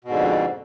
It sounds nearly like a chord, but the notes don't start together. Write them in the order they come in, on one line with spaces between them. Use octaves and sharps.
B2 G#2 D3 F2